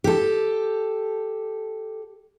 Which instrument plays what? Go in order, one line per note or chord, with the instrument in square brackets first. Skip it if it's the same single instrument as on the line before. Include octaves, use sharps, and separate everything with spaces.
[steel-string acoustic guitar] G4 A4